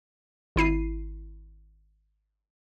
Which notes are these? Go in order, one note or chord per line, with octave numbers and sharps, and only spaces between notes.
G#1 E4 C7 D#7